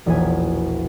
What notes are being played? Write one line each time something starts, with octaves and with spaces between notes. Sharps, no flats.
E1 A#1 E2 G#4 B4 G#5